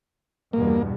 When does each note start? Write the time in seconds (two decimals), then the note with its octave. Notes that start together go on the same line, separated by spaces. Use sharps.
0.53 E2 G2 B2 A#3